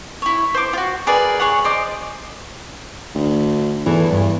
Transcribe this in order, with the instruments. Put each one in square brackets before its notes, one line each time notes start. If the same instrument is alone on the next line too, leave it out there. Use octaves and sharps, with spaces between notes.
[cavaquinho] E4 C#5
C5 D6
F4 F#4
G#4 A#4 B4 D5
G#4 C#5 F#5
C5 D5 D#5 D6
[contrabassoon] D2
[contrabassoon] E2 [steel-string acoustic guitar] E3 A4
[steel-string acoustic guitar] G2